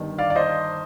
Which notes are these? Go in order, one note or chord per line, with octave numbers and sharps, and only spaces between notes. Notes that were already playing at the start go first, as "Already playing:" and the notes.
Already playing: G1 G2 D#3
D5 F5
D5
C5 D#5